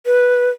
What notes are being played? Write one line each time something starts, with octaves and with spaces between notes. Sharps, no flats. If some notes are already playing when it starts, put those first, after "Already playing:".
B4